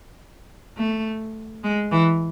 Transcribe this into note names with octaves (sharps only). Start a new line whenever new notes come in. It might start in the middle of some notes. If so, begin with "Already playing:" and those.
A3
G#3
E3